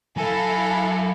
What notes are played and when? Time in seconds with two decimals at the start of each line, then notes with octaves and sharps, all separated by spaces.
0.17 F#3 E4 A4 F5 G#5